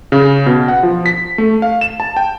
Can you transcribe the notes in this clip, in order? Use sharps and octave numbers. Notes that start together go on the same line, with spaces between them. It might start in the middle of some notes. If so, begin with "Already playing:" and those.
C#3
B2
F#5
F3
B6
A3
F5
E7
A5
G5